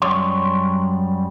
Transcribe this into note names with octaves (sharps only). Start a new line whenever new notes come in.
F#2 G3 C#5 C6